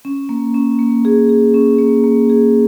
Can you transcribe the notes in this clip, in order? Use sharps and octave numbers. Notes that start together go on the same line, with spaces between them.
C#4
A#3
C#4
A#3
G#4
G#4
C#4
A#3
A#3
G#4